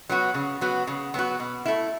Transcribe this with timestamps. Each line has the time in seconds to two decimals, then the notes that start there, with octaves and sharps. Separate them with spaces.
0.09 F#3 B3 F#4
0.34 C#3
0.61 F#3 B3 F#4
0.87 C#3
1.14 F#3 B3 F#4
1.40 B2
1.66 A3 E4